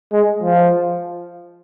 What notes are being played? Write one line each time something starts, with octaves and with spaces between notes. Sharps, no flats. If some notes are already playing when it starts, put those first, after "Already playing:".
G#3
F3